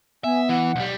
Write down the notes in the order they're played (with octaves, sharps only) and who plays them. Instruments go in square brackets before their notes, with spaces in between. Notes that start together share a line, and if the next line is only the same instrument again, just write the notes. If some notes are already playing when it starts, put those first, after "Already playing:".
[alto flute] B3 [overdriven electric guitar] E5 [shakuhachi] G#5
[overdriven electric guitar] E3 [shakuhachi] F#5
[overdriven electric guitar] B1 G3